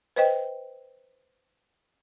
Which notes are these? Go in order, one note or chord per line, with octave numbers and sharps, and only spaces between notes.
B4 C5 D#5 G5